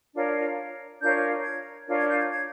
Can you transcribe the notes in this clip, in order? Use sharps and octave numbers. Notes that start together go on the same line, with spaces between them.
D4 F4 A#4 C#5
D4 F4 A#4 C#5 G6
G#6
D4 F4 A#4 C#5
G#6
G6
G#6
G#6